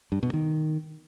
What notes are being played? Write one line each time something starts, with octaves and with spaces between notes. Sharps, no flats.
G2
B2
D#3